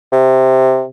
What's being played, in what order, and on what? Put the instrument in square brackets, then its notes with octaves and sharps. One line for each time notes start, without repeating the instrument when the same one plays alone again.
[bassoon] C3